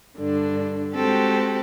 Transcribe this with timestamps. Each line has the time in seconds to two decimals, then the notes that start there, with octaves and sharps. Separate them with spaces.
0.17 G2 D3 D4
0.95 G#3 C4 F#4 G4 A4